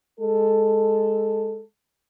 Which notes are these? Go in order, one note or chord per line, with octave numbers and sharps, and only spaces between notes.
G#3 A4